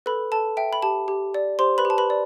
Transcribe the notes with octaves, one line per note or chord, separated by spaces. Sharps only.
A4 B4 B5
A4 A5
E5 G5
B5
G4 A5
G4
D5
G4 C5 C6
B4 B5
G4
A5
B4 B5
D5